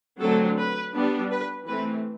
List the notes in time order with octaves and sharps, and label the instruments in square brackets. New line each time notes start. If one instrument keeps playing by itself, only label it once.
[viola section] D3 F#3 A3 C4 A4
B4
G3 B3 D4
B4
E3 A3 C4 B4